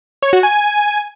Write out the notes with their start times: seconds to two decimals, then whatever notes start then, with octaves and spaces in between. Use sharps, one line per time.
0.22 C#5
0.33 F#4
0.43 G#5